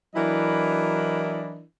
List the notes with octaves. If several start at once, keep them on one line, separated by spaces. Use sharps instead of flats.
E3 F#3 D4 E4 A#4 D#5